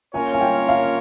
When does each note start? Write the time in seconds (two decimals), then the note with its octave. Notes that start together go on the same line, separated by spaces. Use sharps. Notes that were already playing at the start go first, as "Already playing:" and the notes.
0.14 A#3 C#4 F4 A#4 C#5 G#5
0.33 G#5
0.41 G5
0.69 F5